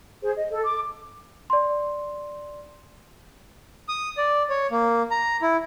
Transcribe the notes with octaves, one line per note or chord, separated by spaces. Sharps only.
G#4 C5
D#5
A4
D6
D5 C6
D#6
D5
C#5
A#3
A#5
E4